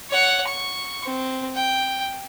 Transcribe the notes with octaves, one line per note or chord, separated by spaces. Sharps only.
C#5 F#5
C#6
C4
G5